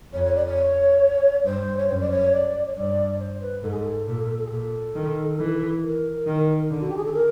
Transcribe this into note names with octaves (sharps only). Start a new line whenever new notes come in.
F2 C#5
C#5
D5
C#5
G2 C5
C#5
F#2 C5
D5
C#5
D5
C#5
G2 D5
C5
B4
G#2 A4
G#4
A4
A#2
G#4
A#2 A4
D#3
E3
A#4
D#3
D3
F#4
G4
G#4
A4
A#4